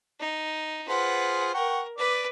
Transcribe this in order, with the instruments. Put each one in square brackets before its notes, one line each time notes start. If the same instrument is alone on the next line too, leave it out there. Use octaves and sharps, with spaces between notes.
[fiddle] D#4
[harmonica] F4 G#4 C5 [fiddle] B4 F#5
[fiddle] A#4 [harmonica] F#5 G5 C#6
[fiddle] B4 [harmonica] D5 D6